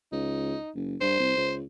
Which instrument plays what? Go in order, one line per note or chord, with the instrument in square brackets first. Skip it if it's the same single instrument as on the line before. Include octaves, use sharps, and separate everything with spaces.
[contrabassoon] C#2 [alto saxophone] D#4
[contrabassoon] F#1
[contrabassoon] G2 [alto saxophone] C5
[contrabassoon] C2
C#2